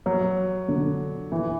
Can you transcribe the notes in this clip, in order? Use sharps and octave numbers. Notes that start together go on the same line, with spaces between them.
F#3
D3
E3